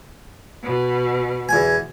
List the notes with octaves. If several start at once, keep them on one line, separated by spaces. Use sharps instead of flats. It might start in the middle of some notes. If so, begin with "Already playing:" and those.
B2
E2 G#5